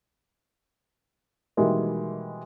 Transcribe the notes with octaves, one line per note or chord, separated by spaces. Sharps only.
B2 D#3 E3 G3 G#3 A#3